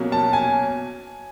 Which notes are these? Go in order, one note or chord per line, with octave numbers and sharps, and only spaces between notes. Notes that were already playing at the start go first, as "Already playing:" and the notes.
Already playing: B2 F#3 A#3 C#4
A5
G#5